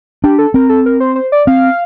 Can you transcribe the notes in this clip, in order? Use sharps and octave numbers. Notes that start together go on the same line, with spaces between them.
D4 G4
A4
C4 A#4
A4
A#4
C5
C5
D5
C4 F5